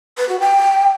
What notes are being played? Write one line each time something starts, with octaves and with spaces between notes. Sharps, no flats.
B4
F#4
G5